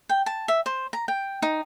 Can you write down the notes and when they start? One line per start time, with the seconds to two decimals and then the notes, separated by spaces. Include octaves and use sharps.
0.09 G5
0.26 A5
0.48 E5
0.66 C5
0.93 A#5
1.08 G5
1.42 D#4